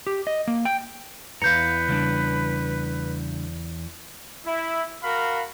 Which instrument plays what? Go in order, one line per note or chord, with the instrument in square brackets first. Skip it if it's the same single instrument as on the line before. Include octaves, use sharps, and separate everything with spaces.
[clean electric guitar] G4
D#5
A#3
G5
[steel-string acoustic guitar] E2 G2 [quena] B4 [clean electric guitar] F5 A#5 [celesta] G6 C#7
[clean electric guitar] C#3 G3 D4
[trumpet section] E4
F#4 A#4 F5 B5